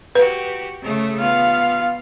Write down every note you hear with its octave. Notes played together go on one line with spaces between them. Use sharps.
F#4 G4 B4
C#3 A3
B3 F4 F5